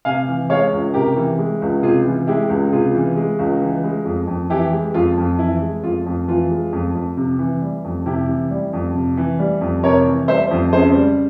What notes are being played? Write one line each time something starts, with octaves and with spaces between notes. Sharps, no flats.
C3 F5 G#5
E3
G#3 C#5 F5
C#2
C3 G4 A#4
E3
G#3
C#2
C3 F4 G#4
E3
G#3 E4 G4
C#2
C3 F4 G#4
E3
G#3
C#2
E3
G#3
F2
F2
E3 E4 G4
G#3
F2 F4
F2
E3 E4
G#3
F2 F4
F2
E3 F4
G#3
F2
F2
C3
E3
G3
F2
C3 E4 G4
E3
G3
F2
C3
E3
G3
F2
C3 A#4 C#5
E3
G3 C5 E5
F2
C#3 G#4 C5
G3